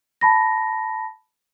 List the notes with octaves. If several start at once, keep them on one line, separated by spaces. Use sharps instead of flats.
A5 B5 A#6